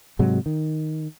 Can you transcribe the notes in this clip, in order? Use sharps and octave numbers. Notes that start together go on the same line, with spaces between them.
G#2 C3 F#3 G#3
D#3